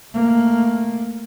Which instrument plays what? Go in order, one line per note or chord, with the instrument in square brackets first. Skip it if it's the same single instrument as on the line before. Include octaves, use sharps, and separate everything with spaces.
[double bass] A3 A#3